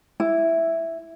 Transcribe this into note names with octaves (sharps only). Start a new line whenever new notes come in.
E4